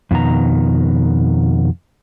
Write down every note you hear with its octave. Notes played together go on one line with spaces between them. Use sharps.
F2 B2 D#3 A#5